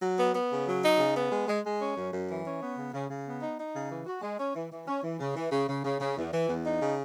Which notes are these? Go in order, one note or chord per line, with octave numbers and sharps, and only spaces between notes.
F#3
B3
B3
C#3
F#3
D#4
C#3
B3
G#3
G#3
G#3
C#4
F#2
F#2
E3
C#4
B3
C#3
C#3
C#3
B3
D#4
D#4
C#3
E3
F#4
G#3
C#4
E3
E3
C#4
E3
C#3
E3
C#3
C#3
C#3
C#3
E2
E3
E2
D#4
C#3